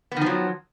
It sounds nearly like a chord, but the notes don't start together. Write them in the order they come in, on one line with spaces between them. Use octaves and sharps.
B3 D#3 F3 F#3